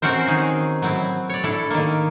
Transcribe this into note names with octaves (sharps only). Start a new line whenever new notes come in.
C4 C#4 F#4 A#4 C5
D#3 D#4 G#4
F#3 C4 E4
C#5 D5
D4 E4 A4
D#3 A#3